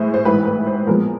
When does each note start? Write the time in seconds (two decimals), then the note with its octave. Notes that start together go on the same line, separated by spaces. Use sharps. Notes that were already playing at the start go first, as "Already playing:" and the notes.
Already playing: A2 E3 G#3 C5
0.14 C5
0.25 A1 G#2 E3 B4
0.45 B4
0.67 C5
0.87 A#2 F3 G#3 B3 A#4